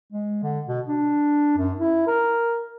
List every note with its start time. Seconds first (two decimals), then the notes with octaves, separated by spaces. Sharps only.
0.13 G#3
0.42 D3
0.67 B2
0.87 D4
1.57 F#2
1.80 E4
2.07 A#4